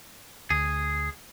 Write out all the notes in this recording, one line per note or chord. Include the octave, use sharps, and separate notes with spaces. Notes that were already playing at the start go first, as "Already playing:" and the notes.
D2 G#4